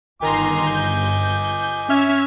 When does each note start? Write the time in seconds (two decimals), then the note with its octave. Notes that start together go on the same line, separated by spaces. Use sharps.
0.22 G1 D#3 D#5 G#5 A#5 C6 D6
0.66 G6
1.90 C#4 E5 F6 G#6